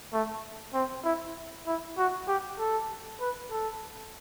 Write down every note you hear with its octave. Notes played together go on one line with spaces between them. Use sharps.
A3
C4
E4
E4
F#4
G4
A4
B4
A4